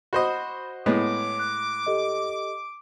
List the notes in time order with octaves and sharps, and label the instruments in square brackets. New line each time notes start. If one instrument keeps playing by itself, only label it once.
[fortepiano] F#4 C5 D#5 [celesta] B5
[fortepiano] A2 G#3 B3 [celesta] C#5 [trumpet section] D6
[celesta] F#6
G4 A4 D#5